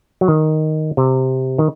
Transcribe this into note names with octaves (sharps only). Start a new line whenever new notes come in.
F#3
D#3
C3
D#3